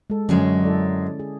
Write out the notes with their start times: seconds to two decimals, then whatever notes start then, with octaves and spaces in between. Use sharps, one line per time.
0.10 G#3 A4
0.29 F#2 D3 F#3 G#3 C#4 D4
0.64 E4 A4 D5
1.19 G#4